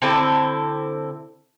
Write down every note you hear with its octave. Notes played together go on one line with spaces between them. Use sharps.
D3 C4 E4 A4